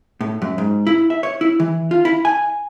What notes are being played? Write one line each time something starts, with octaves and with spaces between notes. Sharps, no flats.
A2
F#2
G#2
E4
E5
C#5
E4
E3
F4
E4
G#5